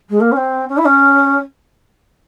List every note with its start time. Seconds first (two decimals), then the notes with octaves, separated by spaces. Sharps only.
0.09 G#3
0.20 A#3
0.31 C#4
0.36 C4
0.68 C#4
0.77 E4
0.86 C#4